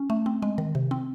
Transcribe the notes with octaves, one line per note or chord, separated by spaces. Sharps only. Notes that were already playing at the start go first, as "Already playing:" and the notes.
Already playing: C#4
A3
C4
G#3
D#3
C3
C4